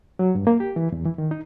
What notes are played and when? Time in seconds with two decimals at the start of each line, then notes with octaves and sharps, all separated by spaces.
0.19 F#3
0.35 G2
0.47 A#3
0.60 G4
0.76 E3
0.92 E2
1.05 E3
1.18 D#3
1.31 D#4